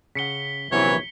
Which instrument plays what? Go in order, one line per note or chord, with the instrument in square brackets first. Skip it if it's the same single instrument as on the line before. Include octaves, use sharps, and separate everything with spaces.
[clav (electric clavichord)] C#3 F#5 [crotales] B6 C#7 G7
[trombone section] A#1 C3 E3 [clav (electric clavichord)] F#3 B3 A#4 [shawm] C#5